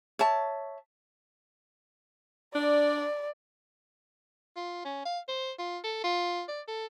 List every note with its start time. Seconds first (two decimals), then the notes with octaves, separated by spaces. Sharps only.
0.19 C#5 E5 A5
2.55 D4 D5
4.56 F4
4.85 C#4
5.05 F5
5.28 C5
5.59 F4
5.84 A4
6.04 F4
6.48 D5
6.68 A4